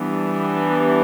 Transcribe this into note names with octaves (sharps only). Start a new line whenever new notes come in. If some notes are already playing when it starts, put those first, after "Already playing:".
Already playing: E3 G3 B3 D4